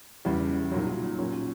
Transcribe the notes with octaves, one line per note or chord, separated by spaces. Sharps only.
E2 C#3 G3
B1 A#2 F#3
A#2 F#3 C#4